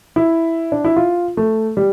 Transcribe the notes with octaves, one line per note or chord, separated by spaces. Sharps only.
E4
D4
E4
F4
A3
G3